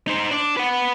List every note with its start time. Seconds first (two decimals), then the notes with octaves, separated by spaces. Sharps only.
0.07 D#4 C5
0.31 D4 D5
0.57 B4 F#5